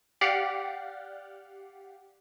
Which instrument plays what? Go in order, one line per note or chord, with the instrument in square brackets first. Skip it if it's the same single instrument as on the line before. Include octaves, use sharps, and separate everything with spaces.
[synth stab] G4 D5 F5 F#5